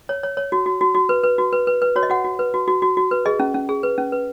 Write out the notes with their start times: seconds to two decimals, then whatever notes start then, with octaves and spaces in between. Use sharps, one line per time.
0.09 C#5
0.23 C#5
0.37 C#5
0.52 F#4
0.66 F#4
0.81 F#4
0.95 F#4
1.09 B4
1.24 B4
1.38 F#4
1.53 B4
1.67 B4
1.82 B4
1.96 F#4 C#5
2.03 D#5
2.10 F#4 F#5
2.24 F#4
2.39 B4
2.54 F#4
2.68 F#4
2.82 F#4
2.97 F#4
3.11 B4
3.26 G#4 D#5
3.40 C#4
3.54 C#4
3.69 G#4
3.83 B4
3.98 C#4
4.12 B4